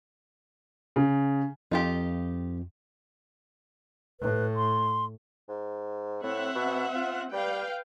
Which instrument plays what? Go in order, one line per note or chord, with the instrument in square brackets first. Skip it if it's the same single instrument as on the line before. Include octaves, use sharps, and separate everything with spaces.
[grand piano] C#3
[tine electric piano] F2 [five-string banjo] D#4 F4 G4
[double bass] A2 [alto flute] B4
[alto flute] C6
[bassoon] G#2
[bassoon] A2 [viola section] C4 E5 F#5
[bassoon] B2
F4
[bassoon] G3 [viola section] B4 F5 G5